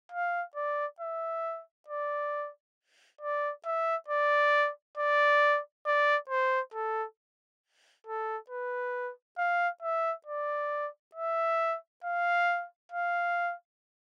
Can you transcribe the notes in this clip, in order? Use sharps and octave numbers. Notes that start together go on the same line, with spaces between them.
F5
D5
E5
D5
D5
E5
D5
D5
D5
C5
A4
A4
B4
F5
E5
D5
E5
F5
F5